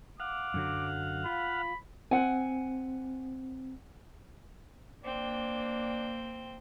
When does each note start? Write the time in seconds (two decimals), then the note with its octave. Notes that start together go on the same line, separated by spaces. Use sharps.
0.20 F5 F#5 D6
0.54 F#2 D3 F#3
1.26 F4 B5
2.11 C4 F#5 G#5
5.04 A#3 C4 D4 D5 G5